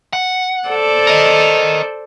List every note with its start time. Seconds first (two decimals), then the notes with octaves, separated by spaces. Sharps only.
0.13 F#5
0.68 A4 C5 D5
1.07 A#4 D#5